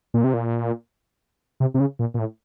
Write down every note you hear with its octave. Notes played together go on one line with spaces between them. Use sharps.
A#2
C3
A#2
C3
C3
C#3
A#2
A#2
A2